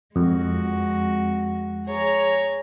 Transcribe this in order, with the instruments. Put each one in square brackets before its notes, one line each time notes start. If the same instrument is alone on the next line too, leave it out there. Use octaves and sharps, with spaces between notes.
[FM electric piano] F2 [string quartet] G#3 F#4
[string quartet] G#4 C#5 A#5